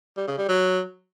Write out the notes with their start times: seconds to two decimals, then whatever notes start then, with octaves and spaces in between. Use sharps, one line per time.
0.17 G3
0.28 C#3
0.38 G3
0.48 F#3